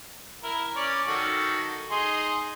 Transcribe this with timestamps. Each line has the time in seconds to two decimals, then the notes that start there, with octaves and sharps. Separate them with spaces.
0.43 E4 A#4
0.76 C#4 C#5 D5
1.08 D#3 F#4 A4
1.91 D#4 G#4 C6